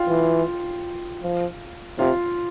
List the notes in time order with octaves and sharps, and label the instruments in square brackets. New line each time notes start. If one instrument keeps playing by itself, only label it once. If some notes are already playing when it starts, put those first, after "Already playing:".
Already playing: [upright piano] F4 F5 G5
[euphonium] E3
F3
[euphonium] C3 [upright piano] F4 F5